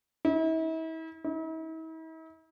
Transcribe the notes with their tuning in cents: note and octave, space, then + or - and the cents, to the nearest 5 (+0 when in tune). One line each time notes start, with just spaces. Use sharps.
E4 -40
E4 -45